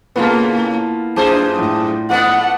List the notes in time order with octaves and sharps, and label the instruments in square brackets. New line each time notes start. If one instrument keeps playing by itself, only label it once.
[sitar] A2 C#3 [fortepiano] A#3 B3 [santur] E4 F4 A4
[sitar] F#2 G#4 C5 [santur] D4 F4
[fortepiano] A2
[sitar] A3 B3 [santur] D5 D#5 [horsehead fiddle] F#5